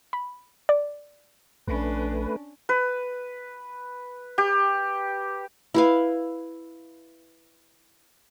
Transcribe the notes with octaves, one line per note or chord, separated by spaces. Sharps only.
B5
D5
A#1 A3 C#4 D4 B4
B4
G4
E4 B4 F5